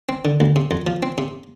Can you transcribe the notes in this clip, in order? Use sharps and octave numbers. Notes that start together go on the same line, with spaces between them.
C4
D3
D2
C3
F2
F3
C4
C3